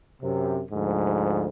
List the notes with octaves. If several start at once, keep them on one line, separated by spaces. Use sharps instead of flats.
F#2 C3
D2 G#2 F3